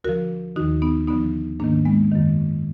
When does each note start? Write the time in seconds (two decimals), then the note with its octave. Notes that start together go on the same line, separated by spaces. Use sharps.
0.04 D2 D3 F3 F#4 A#4
0.56 D#2 D#3 D#4 F#4
0.82 B3 D#4
1.07 D2 D3 F3 B3 D#4
1.60 G#2 D#3 A#3 D4
1.85 G#3 B3
2.11 F#2 D#3